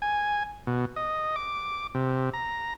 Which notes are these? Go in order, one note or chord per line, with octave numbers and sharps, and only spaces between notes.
G#5
B2
D#5
D6
C3
A#5